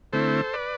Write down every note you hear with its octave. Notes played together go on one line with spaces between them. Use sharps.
D3 A3 C4 E4 A4 C5
B4 D5